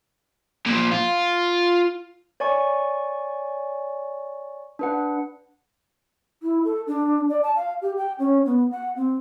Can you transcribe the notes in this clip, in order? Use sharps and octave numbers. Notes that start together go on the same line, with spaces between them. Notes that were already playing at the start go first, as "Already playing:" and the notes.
A#2 F3
F4
C#5 D5 G#5 C#6
D4 B4 F#5
E4
A4
D4
D5
A5
F5
G4
G5
C#4
B3
F#5
C4